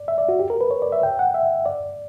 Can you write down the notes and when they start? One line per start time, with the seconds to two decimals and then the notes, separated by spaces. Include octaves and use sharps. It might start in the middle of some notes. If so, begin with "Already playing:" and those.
Already playing: D5
0.08 E5
0.18 D5
0.29 F#4
0.39 G4
0.50 A#4
0.61 B4
0.71 C#5
0.82 D5
0.92 E5
1.03 G5
1.19 F#5
1.34 E5
1.66 D5